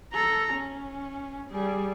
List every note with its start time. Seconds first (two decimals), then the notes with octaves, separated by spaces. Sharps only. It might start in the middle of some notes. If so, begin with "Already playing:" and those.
0.13 A4 A#5
0.54 C#4
1.50 G3 G#4